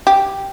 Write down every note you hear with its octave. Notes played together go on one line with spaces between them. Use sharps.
G4